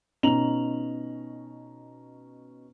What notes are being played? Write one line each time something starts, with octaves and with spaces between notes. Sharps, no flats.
B2 C#4 D#4 A#5 F7 F#7